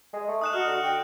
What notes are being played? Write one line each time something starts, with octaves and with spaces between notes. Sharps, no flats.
G#3
A3
D#4 D#6 F#6 E7
F#4 F6
D3
G5